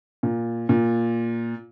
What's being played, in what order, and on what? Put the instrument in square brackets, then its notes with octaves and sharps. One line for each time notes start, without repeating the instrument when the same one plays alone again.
[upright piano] A#2
A#2